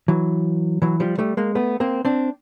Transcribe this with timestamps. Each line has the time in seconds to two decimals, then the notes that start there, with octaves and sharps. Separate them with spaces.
0.08 E3 F#3
0.82 E3 F#3
1.00 F3 G3
1.18 G3 A3
1.37 G#3 A#3
1.55 A3 B3
1.80 A#3 C4
2.05 C4 D4